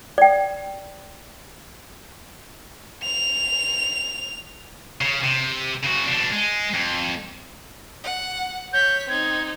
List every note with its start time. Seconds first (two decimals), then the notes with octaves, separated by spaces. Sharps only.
0.18 D5 G5
3.03 F7
5.01 C#3
5.23 C3
5.84 C#3 F#4
6.08 B2 D4
6.32 G#3
6.74 F2
8.04 F#5
8.73 C#5 G6 B6
9.09 C4 D#4 G#6